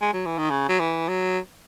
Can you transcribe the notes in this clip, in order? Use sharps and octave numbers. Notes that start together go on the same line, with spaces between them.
G#3
F#3
E3
D#3
C#3
F#3
E3
F#3